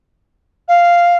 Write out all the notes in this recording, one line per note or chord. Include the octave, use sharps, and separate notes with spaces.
F5